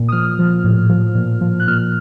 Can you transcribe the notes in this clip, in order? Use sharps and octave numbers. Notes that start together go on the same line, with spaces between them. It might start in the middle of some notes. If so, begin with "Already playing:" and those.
Already playing: A#2
D#6
F3 F6
F3
A2
F3
A#2
F3
F#6
A#2 F6